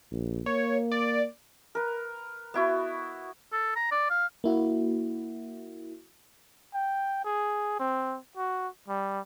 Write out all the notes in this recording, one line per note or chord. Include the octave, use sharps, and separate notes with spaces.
A#1
A#3 C#5
D5
A#4 B4
B3 E4 F#4
A4
A#5
D5
F5
A#3 E4 F#4
G5
G#4
C4
F#4
G3